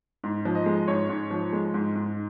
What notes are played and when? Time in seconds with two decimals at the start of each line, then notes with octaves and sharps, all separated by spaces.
0.24 G#2
0.45 F3
0.55 D#5
0.66 G#3
0.88 G#2 C#5
1.09 G#2
1.31 F3
1.52 G#3
1.74 G#2
1.95 G#2